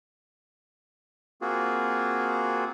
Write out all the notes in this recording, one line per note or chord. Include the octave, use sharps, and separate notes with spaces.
A#3 C4 F4 F#4 G#4